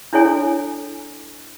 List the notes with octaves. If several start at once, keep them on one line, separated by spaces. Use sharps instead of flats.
D4 E4 A4 C#5 G#5